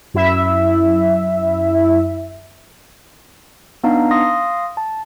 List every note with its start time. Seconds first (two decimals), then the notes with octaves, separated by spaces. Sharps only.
0.14 F#2 E4 E5
3.84 B3 D4 D#4 F5 A#5
4.11 F5 C6 D#6 A#6
4.77 A5